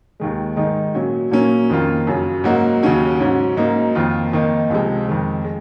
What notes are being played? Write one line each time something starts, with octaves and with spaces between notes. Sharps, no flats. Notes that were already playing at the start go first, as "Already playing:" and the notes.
D#2 D#3 G#3
G#2 D#3 G#3 D#4
A#2 F#3 C#4
A#2 F#3 A#3 C#4
F2 D#3 A#3 F4
F#2 C#3 F#3
G#2 F#3 A#3 D#4 F#4
D#2 C#3 F#3 C#4 F#4
G#2 F#3 C#4
G#2 F#3 A#3 D#4
F2 D#3 A#3 F4
F2 D#3 A#3 D#4
C#2 C3 F3 G#3
F2 D#3 G#3
G#3